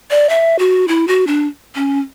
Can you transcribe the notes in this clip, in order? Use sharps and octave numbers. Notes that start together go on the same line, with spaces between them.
D5
E5
F#4
E4
F#4
D4
C#4